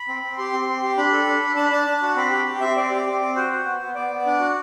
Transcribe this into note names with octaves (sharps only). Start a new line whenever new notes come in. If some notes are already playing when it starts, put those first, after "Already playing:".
Already playing: B5
C4
C4
G4 C6
C4
C4
G4
D4 B5
A4
D4
D4
D4 A5
B5
D4 A5
D4
F#4
C4 B5
G4
G4
C4 E5
C4 D5
G4
C4
C4
F#4 C5
F#4
B3
B3
B3 D5
B3
D4
F#4